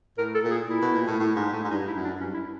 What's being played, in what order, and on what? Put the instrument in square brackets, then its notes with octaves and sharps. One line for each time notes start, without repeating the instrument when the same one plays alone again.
[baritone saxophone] A2 [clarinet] A#4
[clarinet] A4
[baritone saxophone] A#2
[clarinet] G#4
[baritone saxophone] A#2 [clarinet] E4
[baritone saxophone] B2
A#2
A2
A2
G#2
A2
G#2
[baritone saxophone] G2 [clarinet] D#4
[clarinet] E4
[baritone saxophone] F#2
[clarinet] D4
[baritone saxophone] G2 [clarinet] C#4
[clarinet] E4